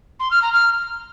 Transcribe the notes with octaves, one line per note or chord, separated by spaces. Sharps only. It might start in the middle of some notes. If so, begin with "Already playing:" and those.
C6
F6
A#5
F6